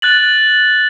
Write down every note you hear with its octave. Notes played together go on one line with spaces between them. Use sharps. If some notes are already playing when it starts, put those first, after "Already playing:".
F#6 A6 F#7